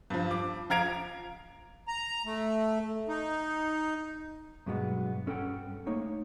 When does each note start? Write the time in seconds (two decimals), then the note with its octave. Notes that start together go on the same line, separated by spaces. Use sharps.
0.10 G2 F3
0.31 D6
0.70 F3 F5 A#5 G#6 D7 F7
1.88 A#5
2.25 A3
3.09 D#4
4.66 G2 B2 F#3 G#3 B3
5.26 G2 C#4 A4 F#5 G5
5.86 A3 A#3 D#4 C#5